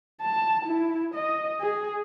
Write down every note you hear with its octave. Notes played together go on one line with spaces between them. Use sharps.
A5
E4
D#5
G#4